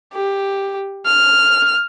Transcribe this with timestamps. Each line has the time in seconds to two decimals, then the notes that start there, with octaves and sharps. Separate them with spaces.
0.13 G4
1.05 F6